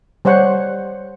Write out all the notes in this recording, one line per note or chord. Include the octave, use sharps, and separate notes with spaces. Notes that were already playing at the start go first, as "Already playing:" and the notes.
G3 C5 C#5 F#5